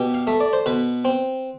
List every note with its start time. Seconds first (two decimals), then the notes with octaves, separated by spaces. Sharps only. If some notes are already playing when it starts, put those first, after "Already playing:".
Already playing: B2 G4
0.14 F5
0.27 A3 E5
0.41 D5
0.53 C5
0.66 B2 B4
1.05 C4